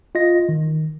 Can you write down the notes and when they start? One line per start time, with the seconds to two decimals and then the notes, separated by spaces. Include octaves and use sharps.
0.15 F4 D#5 A#6
0.49 D#3